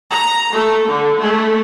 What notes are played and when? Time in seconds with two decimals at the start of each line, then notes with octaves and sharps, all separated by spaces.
0.11 A#5
0.52 A3
0.88 D3
1.19 A3